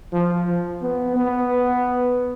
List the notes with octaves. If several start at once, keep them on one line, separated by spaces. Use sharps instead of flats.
F3
B3
B3